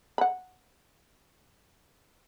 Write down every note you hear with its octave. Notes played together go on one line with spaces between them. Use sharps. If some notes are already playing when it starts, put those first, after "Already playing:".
F#5 B5